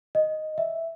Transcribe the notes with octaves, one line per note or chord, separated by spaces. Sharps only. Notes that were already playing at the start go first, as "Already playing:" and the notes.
D#5
E5